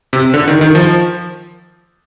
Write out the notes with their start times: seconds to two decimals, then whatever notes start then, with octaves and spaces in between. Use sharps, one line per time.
0.13 C3
0.34 D3
0.48 D#3
0.61 D#3
0.75 F3